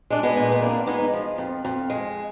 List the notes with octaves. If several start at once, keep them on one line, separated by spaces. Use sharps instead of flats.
G#3 D4
G#3 B3
A#2
B3
F2 A#3 D4
G#3 B3 D#4
F3
F2
F2
G#3